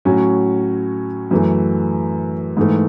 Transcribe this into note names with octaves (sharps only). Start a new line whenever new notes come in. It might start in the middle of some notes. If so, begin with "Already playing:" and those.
A2 F#3 C#4 F#4
F#2 E3 A3
G#2 E3 A3